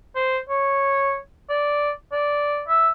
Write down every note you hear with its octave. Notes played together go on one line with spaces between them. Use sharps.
C5
C#5
D5
D5
E5